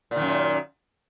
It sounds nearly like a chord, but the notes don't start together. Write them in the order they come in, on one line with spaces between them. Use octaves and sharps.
A#2 D#3 F#2